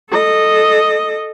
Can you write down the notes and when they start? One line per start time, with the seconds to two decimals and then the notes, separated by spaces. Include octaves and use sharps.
0.10 A4 D#5